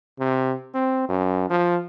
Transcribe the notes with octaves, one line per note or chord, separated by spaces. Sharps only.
C3
C4
F#2
F3